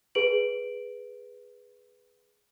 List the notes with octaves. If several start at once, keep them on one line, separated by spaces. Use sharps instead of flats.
G#4 B4 D7 F#7